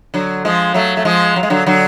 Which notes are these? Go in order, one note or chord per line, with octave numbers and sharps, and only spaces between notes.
D3 F#3
F3 G#3
F#3 A3
A3
F3 G#3
F#3
G#3
D3 F#3
D3 F#3